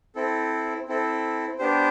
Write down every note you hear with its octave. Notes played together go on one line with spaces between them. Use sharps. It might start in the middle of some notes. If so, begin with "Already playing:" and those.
C4 E4 A4
C4 E4 A4
B3 D4 G4 C5